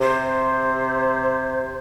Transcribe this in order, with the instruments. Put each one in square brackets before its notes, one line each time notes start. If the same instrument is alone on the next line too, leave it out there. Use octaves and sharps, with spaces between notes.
[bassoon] C3 [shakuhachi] C5